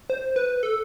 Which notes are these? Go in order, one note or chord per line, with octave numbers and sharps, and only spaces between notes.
C5
B4
A4